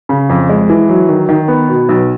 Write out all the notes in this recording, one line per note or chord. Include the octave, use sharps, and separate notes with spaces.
C#3
F2
G#3
E3
F#3
D#3
D#3
B3
B2
B1